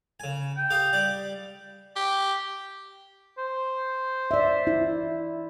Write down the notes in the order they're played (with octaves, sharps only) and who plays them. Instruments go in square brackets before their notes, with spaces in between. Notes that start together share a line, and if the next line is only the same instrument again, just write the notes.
[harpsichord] C#3 G#5
[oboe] G5
[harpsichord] G4 F5 D#6
G3 D5
[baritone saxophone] G4
[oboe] C5
[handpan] D5 E5
E4